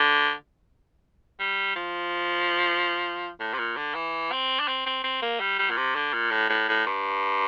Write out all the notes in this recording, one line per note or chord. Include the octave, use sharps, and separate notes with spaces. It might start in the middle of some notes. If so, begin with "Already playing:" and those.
Already playing: D3
G3
F3
A2
C3
A#2
D3
E3
C4
D4
C4
C4
C4
A#3
G3
G3
A#2
C3
D3
A#2
A2
A2
A2
G2